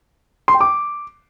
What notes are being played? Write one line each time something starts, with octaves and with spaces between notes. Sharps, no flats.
C6
G5
D6